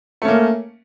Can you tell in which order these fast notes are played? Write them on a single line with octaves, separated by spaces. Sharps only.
A3 C#4 A#3